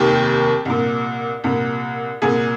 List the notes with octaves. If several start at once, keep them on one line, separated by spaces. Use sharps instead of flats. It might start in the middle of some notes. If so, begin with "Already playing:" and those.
Already playing: F1 D#2 D#3 G4
C2 A#2
C2 A#2
C2 A#2 G#4